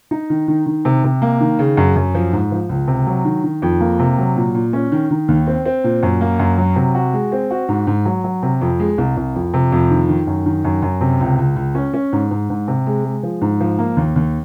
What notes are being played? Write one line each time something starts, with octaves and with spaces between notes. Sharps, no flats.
D#4
D#3
D#3
D#3
C3
C3
A#3
D#3
C#3
F#2
F#2
F3
G#2
F3
C#2
C3
F#3
D#3
D#3
F2
A#3
C3
F#3
A#2
A#2
C#4
D#3
D#3
D#2
C4
C4
A#2
F#2
A#3
F#2
F#3
C3
F#4
G#3
C4
F#4
G#2
G#2
F#3
F#3
C3
F2
G#3
C2
C2
F2
C3
F2
D#3
D#3
F#2
D#3
F#2
F#2
C3
C#2
C#2
C#2
C#4
C#4
G#2
G#2
G#2
C3
G#3
G#3
F3
G#2
F3
A#3
D#2
D#2